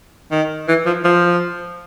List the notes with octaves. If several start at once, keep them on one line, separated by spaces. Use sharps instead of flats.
D#3
E3
F3
F3